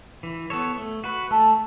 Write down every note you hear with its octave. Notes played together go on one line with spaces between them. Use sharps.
E3
B3 A4 C#5
A3
F#4 B4
A3 A5